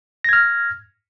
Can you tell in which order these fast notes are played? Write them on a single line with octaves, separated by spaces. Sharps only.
A#6 G#6 F6